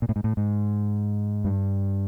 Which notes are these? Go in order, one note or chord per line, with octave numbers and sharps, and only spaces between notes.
A#2
A2
G#2
A2
G#2
G2